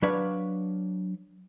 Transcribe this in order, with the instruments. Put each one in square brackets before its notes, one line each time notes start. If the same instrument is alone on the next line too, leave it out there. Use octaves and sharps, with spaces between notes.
[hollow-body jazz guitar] F#3 D4 B4 C#5 D5 F5